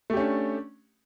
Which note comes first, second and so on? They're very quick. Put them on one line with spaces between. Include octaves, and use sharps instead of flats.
A3 G4 C#4 D4